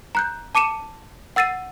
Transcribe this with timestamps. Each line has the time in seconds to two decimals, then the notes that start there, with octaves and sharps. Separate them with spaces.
0.15 A#5 F#6 G6
0.55 A5 D6 C#7 D#7 E7
1.36 F#5 E6 A6 C7 D#7